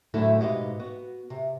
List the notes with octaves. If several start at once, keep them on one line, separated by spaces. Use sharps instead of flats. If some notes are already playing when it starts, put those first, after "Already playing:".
D2 A2 D3 F#3 E4 A4
G#2 B2 G4 B4 D#5 F5
B3 F#4
C3